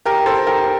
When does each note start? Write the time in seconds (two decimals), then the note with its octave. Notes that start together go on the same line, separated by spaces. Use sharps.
0.05 G4 A#4
0.26 A4 C5
0.47 G4 A#4